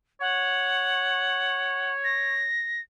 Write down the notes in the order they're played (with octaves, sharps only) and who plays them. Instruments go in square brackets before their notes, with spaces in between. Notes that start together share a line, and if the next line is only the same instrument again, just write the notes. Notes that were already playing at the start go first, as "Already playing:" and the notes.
[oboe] C#5 [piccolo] F#5
[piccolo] A#6